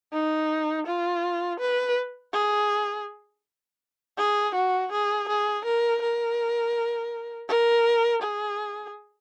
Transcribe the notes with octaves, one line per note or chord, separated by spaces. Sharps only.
D#4
F4
B4
G#4
G#4
F#4
G#4
G#4
A#4
A#4
A#4
G#4